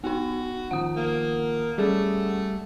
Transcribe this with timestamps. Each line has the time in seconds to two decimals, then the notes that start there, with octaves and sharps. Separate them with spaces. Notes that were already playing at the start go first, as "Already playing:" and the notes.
0.04 B3 D#4 F#4
0.71 D#3 F3 F#5 D#6
0.96 A#3
1.78 G3 A3 C#4 G#4